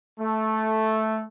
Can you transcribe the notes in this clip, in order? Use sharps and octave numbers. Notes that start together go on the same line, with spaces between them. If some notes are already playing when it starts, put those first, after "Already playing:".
A3